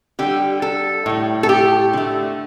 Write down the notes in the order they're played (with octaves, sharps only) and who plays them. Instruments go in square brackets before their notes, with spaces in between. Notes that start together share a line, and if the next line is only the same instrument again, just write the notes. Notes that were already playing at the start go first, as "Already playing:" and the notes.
[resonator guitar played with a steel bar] D3 G3 G4
A4
A2 G3
A4
G4
D3 A3